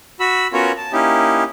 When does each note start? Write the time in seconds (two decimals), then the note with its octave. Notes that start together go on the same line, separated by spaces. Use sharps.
0.20 F#4 B5 E6
0.53 B3 C#4 F4 F#4 A#4 C#5
0.77 A5
0.93 A#3 C#4 D#4 E4 G4